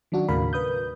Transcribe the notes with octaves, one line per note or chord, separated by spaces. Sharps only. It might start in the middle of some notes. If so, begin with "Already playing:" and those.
D#3 F#3 D4 F#4
D#2 A2 C#3 A#4 F5 B5
B4 D#6 G6